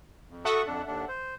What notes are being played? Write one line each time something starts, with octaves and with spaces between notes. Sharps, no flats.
F2
F#4 A4 E5 F#5 C#6 D#6
F2 D4
D#2 D4
C5